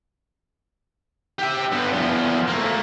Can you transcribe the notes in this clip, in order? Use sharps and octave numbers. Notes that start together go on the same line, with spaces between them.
G4 E5
G2 B3
E2 F3
A3 A#3